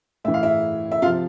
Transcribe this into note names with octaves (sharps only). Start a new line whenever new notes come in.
A2 E3 E5
F5
E4 E5
E5
C3 F3 F4 F5